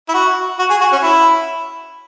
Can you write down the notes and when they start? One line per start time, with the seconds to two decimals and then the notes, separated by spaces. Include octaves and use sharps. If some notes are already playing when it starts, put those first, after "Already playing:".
0.09 E4
0.14 F#4
0.59 F#4
0.70 G#4
0.81 F#4
0.92 C#4
1.03 E4